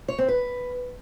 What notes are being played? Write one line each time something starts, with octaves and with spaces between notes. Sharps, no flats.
C#5
C4
B4